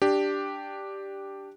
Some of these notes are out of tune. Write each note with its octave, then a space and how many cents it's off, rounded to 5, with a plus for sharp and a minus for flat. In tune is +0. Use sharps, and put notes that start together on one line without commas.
D4 +0 G4 +0